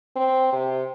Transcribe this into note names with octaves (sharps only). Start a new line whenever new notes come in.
C4
C3